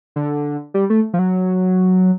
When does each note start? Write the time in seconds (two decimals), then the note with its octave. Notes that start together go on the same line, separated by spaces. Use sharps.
0.16 D3
0.74 G3
0.90 A3
1.14 F3
1.19 F#3